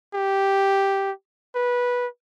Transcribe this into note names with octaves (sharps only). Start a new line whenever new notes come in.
G4
B4